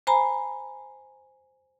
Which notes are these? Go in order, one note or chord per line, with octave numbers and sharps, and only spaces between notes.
C5 G#5 A#5 B5